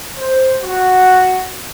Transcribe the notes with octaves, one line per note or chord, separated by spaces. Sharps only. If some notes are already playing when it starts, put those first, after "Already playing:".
C5
F#4